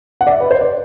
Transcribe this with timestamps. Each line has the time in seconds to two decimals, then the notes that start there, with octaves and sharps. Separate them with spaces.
0.21 F#5
0.27 D5
0.30 E5
0.40 B4
0.51 C5
0.61 D5